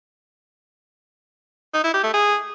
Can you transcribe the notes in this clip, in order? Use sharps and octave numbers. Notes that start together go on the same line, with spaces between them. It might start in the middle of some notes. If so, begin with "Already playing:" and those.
D#4
E4
G4
A3
G#4